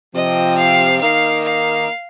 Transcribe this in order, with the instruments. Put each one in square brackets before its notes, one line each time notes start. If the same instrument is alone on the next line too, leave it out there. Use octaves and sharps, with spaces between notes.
[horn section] C3 F3 C4 [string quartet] D#5
[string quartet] F5
[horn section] D#3 A#3 D#4 A#4 [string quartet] F5
[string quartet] F5